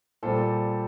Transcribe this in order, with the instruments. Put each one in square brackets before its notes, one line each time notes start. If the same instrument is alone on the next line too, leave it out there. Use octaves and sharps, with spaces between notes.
[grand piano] A#2 G3 A4 C5